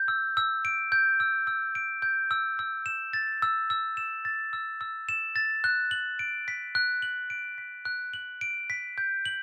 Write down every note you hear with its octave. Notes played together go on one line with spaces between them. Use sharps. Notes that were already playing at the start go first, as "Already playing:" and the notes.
Already playing: G6
E6
E6
D7
G6
E6
E6
D7
G6
E6
E6
E7
A6
E6
E6
E7
A6
E6
E6
E7
A6
F#6
F#7
D7
B6
F#6
F#7
D7
B6
F#6
F#7
D7
B6
G6
F#7